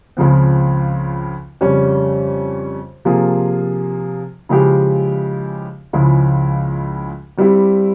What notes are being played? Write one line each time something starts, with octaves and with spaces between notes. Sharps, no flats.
C#2 C#3 F3 C4
F2 C#3 G3 C#4
C3 F3 A#3 F4 G#4
C#3 F3 G#3 E4 G4
C#2 C#3 F3 G#3 E4
G2 G3 C4 E4 G4